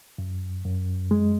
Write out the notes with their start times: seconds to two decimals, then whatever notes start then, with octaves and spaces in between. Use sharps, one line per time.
0.18 F#2
0.65 F#2
1.11 G#3